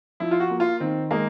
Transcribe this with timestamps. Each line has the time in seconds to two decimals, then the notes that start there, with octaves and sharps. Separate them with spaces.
0.20 F3 E4
0.31 F4
0.40 F#4
0.51 A#3
0.60 F4
0.80 D#3 C4
1.11 G#3 A#3